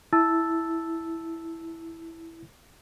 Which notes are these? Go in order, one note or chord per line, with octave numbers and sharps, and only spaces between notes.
E4 A5 E6 A6